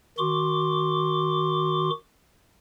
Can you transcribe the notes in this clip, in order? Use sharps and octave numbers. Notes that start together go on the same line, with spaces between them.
D#3 F#4 C6 D6